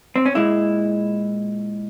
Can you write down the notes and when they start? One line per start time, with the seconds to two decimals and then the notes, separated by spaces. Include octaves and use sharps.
0.16 C4
0.26 C#4
0.35 A#2 G#3 E4